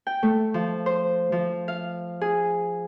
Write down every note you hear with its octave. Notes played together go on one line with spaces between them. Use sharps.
G5
A3
F3
C5
F3
F5
G#4